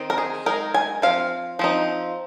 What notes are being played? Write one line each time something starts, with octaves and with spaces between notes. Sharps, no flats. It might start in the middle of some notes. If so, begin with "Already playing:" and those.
Already playing: D#3 C4 D#4
A#4
G#4
G#3 D#4 A#4
G#5
F3 C4 F5
F3 C4 D#4